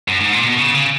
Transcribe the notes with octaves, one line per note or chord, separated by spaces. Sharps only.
F#2
G#2
A#2
B2
C#3
C#3